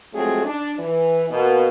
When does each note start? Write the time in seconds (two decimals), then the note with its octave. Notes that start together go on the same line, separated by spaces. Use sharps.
0.13 F3 F#3 G#3 A3 C4 G#4
0.44 D4
0.78 E3
1.31 B2 A#3